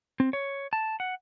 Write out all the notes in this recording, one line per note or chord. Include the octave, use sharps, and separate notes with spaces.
C4
C#5
A5
F#5